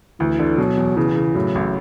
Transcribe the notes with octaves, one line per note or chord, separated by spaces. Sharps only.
D2 E3
D3
B2 F#3
E2
C#3 E3
C#3
A2 F#3
A1